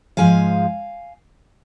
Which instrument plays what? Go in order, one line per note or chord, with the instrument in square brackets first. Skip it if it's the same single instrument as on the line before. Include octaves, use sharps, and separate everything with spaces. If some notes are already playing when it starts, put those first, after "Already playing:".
[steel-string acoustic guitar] G#2 F3 G#3 F5 G#5